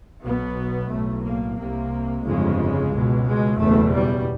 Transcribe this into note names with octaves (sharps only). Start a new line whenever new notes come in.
B1 B2 B3
B1 A2 A3
A#3
C2 C3 A#3
G1 F2 C#3 G#3
C#2 B2
G#3
F#1 E2 B2 A3
G3